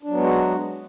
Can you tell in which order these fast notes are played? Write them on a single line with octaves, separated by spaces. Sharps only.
D4 F#3 B3 G#3 F#4